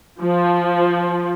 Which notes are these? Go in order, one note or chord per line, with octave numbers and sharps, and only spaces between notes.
F3